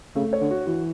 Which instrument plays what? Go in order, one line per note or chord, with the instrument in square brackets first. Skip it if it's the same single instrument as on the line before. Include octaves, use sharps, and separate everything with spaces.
[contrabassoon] C#3 [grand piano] A3
[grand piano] C#5
[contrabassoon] D3
[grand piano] F#4
[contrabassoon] E3 [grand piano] F#4